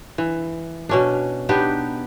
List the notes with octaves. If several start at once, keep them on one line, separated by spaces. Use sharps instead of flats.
E3
B2 C#4 D4
B3 D4 D#4 G4